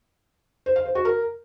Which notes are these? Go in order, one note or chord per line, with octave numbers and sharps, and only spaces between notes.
C5
F5
C5
F#4
A#4